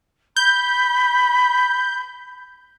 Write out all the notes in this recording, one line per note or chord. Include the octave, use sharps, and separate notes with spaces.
B5 G6